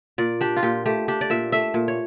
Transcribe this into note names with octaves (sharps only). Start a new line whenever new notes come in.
A#2 D5
D4 G4
F4
A#2 G4
A3 G4
D4 G4
D5
A#2 E5
A3 E5
A#2
C#5